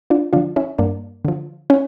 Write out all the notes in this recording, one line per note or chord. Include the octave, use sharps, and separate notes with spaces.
D4 F4
D3 F3 D4 F4
C#4 E4
G2 A#3 D4
D3 F3
C#4